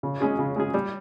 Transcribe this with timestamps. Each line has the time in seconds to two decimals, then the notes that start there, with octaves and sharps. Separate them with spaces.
0.03 C#3
0.21 G#3 C#4 G#4
0.39 C#3
0.56 G#3 C#4 G#4
0.74 G3